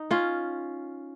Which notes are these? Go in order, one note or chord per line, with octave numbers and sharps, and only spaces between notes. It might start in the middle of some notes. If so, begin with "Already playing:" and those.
Already playing: D#4
C#4 F4